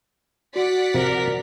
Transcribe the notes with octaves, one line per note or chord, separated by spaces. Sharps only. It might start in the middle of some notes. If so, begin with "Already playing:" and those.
F#4 D5 F#5 B6
C3 F3 A#4